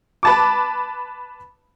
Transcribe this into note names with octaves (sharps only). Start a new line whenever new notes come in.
B4 A5 D6